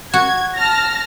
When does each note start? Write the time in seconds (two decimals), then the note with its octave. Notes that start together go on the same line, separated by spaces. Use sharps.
0.13 F#4 G#6
0.56 A5 F6 A#6